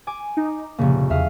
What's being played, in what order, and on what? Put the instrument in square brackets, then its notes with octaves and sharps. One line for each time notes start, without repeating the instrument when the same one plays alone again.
[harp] G#5 D6
[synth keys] D#4
[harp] F1 C#3 [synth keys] A#2 A#3
[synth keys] E2 [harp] E5 F5 D#6